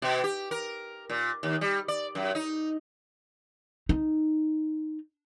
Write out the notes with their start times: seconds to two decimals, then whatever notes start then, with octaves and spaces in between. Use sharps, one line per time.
0.02 B2
0.24 G4
0.51 A#4
1.10 A#2
1.43 D#2
1.61 G3
1.88 D5
2.15 F#2
2.35 D#4
3.89 D#4